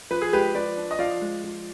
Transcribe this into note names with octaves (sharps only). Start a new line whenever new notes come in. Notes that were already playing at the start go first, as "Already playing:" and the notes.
F3 B4
G#4
G#3 G4 B4
F3 B4 D5
D4
D#5
F3 D5 F5
G#3
F3